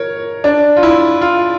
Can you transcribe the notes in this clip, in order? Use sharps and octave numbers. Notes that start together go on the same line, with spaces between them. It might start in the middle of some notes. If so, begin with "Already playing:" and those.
Already playing: A#4 C#5
D4
F4
E4
F4